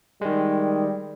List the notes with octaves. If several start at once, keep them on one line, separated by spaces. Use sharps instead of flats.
D#3 G3 G#3